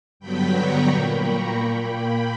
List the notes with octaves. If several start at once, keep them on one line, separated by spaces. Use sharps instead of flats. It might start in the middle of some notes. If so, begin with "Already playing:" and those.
G2 D3 F#3 B3 G5 B5
A#5 C#6
A#2 A#3 G5 B5
A#5 C#6
A#2 A#3 G5 B5